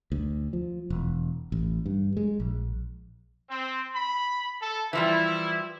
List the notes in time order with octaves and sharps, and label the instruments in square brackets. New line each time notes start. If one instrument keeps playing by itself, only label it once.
[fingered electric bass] D2
F3
E1
A1
G2
G#3
A#1
[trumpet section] C4
B5
A4
[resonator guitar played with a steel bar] E3 F3 G3 [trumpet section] E4